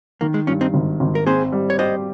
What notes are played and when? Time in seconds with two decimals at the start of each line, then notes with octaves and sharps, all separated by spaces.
0.21 D#3 A#3
0.34 G#3
0.47 G2 C#4 F4
0.61 C4 D#4
0.74 G#1
1.00 G#1
1.15 A#4
1.26 C4 G#4 C5
1.52 G3
1.70 C#5
1.79 G4 C5 D#5